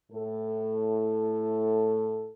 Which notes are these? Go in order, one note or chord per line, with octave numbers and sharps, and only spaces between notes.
A2 A4